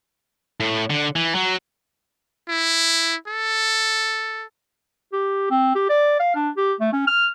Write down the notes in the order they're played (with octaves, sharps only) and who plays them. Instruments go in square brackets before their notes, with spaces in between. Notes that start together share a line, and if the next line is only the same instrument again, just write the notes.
[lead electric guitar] A2
D3
E3
F#3
[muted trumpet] E4
A4
[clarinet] G4
C4
G4
D5
F5
D4
G4
A3
C#4
F6